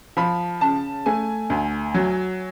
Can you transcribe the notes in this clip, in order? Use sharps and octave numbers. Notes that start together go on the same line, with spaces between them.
F3 B5
C#3 A5
A3 G#5
D2
F#3